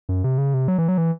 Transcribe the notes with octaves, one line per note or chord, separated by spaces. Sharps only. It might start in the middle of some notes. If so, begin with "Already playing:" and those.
F#2
C3
C#3
C3
F#3
E3
F#3
E3